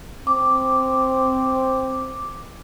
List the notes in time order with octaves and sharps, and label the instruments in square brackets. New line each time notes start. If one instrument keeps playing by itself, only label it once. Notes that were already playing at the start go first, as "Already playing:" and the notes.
[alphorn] C4 [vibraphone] D6